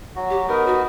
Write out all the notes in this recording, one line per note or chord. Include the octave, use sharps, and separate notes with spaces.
F#3 F#4
G4
B3 D#4 A#4
F#4